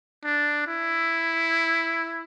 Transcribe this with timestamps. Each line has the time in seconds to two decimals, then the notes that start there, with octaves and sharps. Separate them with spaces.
0.24 D4
0.67 E4